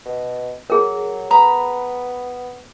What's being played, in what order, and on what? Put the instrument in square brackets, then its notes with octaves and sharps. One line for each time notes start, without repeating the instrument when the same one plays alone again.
[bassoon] B2
[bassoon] F#3 [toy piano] G#4 A#4
[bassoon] B3 [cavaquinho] A#5 B5 D#6